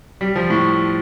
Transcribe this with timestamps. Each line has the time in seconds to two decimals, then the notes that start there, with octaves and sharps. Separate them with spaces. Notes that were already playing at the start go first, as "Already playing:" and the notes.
0.21 G3
0.36 F3
0.50 A2